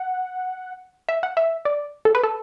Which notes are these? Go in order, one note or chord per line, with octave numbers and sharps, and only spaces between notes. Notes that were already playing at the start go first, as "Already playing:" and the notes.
Already playing: F#5
E5
F#5
E5
D5
A4
B4
A4